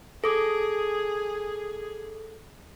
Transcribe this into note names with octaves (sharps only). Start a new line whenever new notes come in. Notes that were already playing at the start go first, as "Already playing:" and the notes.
G#4 A4 D6